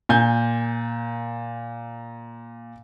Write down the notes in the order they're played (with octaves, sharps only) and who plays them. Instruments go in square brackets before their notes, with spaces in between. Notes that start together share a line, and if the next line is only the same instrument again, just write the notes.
[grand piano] A#2 G#5 G6